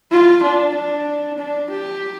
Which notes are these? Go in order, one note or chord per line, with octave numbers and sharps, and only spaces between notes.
F4
D4
D4
D4
G4